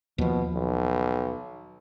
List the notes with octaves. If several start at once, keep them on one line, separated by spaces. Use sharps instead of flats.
D#2 B2 F3
B1